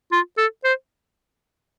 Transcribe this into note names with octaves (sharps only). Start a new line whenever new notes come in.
F4
A4
C5